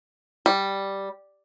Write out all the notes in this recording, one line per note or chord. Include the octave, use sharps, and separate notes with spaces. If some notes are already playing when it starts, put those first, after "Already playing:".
G3